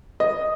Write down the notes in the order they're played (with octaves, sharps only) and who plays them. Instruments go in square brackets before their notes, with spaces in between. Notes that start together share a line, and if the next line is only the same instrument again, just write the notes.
[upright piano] D#5